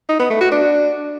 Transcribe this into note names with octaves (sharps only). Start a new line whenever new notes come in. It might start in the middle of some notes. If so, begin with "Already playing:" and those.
D#4
B3
A3
F#4
D4